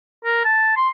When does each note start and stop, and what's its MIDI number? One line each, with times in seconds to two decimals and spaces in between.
0.25 0.43 70
0.45 0.76 81
0.77 0.89 84